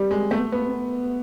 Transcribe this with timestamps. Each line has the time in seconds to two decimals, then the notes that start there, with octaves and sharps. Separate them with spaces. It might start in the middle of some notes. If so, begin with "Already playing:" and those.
Already playing: G3
0.11 G#3
0.31 A3 B3
0.51 A#3 B3
0.67 C4
0.73 B3